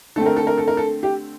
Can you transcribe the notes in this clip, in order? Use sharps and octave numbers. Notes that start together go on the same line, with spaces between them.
D3 A3 C4 A4
A#4
A4
A#4
A4
A#4
A4
G4